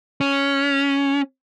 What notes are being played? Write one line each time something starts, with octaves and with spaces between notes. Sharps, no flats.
C#4